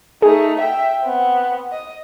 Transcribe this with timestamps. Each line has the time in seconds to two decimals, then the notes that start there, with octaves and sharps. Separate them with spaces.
0.22 A3 D#4 G#4
0.59 E5 G5
1.04 B3 C4
1.72 D#5